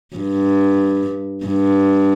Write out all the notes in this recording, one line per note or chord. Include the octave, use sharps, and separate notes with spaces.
G2
G2